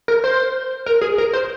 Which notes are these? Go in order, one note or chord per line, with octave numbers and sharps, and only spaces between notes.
A#4
C5
A#4
G#4
A#4
C5